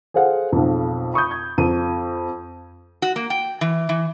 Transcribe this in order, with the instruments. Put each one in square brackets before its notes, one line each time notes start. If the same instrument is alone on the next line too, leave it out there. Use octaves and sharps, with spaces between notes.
[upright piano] G#4 A4 C5 F5 F#5
B1 F2
B5 C#6 D#6 G6
G#6
F2 D#7
[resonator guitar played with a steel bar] F#4
A#3
G5
E3
E3